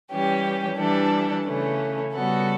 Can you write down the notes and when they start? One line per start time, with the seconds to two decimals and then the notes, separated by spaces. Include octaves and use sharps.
0.11 E3 G3 C#4 G4
0.78 E3 G3 D4 A4
1.46 C#3 E3 A3 C#4
2.13 C#3 G3 B3 F#4 A4